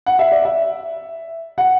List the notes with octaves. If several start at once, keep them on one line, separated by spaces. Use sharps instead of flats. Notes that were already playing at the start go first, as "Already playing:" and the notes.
F#5
E5
D5
E5
F#5